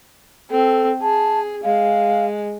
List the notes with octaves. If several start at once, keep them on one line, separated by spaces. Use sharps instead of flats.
C4 A4
G#4 A5
G#3 F5